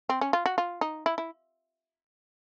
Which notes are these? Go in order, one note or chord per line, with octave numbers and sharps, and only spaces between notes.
C4
C#4
F4
F#4
F4
D#4
E4
E4